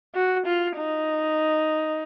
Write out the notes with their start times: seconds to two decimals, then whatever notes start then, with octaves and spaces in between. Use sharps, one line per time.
0.15 F#4
0.46 F4
0.76 D#4